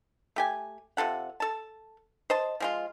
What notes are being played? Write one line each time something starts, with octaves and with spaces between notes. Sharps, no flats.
A3 G4 G#5
C3 F4 A4 F#5
A4 A5
C5 D#5 A5
F3 G#3 F4